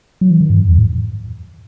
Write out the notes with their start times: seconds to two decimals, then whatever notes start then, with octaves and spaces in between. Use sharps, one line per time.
0.21 F#3
0.31 E3
0.41 D#3
0.50 G2
0.59 F#2
0.68 E2
0.78 A2